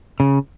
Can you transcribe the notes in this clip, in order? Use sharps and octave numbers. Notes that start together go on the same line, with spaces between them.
C#3